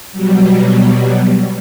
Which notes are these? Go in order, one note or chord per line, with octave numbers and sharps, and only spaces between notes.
B2 F#3 G3